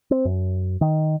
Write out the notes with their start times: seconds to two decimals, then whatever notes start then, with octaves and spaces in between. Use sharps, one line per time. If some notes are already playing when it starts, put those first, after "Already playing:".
0.11 C4
0.25 F#2
0.81 D#3